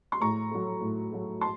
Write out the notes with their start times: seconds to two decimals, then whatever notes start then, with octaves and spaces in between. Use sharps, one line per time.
0.12 C6
0.21 A2 A#5 C#6
0.51 F#3 A3
0.81 A2
1.12 F#3 A3
1.41 A5 C6